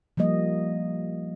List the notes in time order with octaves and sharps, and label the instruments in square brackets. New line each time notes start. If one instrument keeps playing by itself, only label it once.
[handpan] F3 G3 A#3 D#5